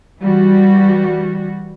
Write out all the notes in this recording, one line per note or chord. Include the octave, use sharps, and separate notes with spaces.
E3 G3 F#4